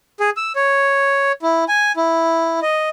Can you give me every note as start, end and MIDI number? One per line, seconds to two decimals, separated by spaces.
0.20 0.30 68
0.37 0.53 88
0.56 1.32 73
1.43 1.64 64
1.68 1.92 80
1.97 2.60 64
2.62 2.90 75